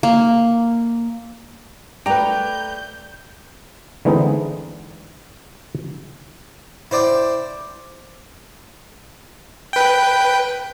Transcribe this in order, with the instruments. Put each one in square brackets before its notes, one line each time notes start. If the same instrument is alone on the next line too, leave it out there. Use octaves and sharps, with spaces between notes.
[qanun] A#3
[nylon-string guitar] A3 A4 D5 [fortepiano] B4 A#5 [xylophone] G5 F7 [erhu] G6
[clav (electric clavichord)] D3 E3 G#3 B3 C4 D#4
[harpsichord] E4 C5 D5 G5
[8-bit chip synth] B4 G5